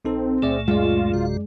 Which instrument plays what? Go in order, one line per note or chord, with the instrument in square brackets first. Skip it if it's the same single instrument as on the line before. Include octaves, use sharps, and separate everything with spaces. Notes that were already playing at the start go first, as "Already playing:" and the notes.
[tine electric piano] A#1 D#4 A4 [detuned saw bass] C4
[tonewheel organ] C#2 A#2 A3 [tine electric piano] G#4 D5 E5
[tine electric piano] F#2 D5 [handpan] G#3 [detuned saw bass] F4
[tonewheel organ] A#1 C3 F#4